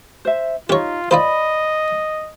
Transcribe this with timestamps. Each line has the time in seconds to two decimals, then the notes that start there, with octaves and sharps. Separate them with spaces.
0.25 C5 E5
0.70 C#4 D#4 F4 G4 C#5
1.11 D#4 F4 C5 D5 D#5 B5